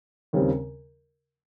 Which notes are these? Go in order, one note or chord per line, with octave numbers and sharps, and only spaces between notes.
D#2 C#3 G3 C4